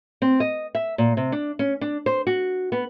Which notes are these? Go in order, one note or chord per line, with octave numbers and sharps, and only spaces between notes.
C4
D#5
E5
A#2
C3
D4
C#4
D4
C5
F#4
B3